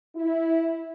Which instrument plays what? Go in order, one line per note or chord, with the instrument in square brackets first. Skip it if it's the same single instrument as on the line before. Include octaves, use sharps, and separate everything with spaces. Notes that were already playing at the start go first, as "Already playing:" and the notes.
[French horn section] E4